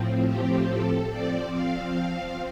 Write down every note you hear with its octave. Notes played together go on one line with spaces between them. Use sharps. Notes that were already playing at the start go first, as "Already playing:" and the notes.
Already playing: A2 F3 C4
G4
A4
F3 C4 D5
F5
F5